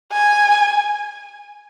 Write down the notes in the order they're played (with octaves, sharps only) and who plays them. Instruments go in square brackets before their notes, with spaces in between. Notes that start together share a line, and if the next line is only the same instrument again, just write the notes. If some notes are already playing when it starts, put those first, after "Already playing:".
[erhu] G#5